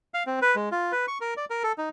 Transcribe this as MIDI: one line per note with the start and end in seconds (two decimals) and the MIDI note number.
0.14 0.23 77
0.27 0.40 60
0.42 0.55 71
0.55 0.69 56
0.72 0.92 65
0.92 1.06 71
1.08 1.18 85
1.21 1.34 70
1.37 1.45 74
1.50 1.63 70
1.64 1.72 69
1.78 1.89 63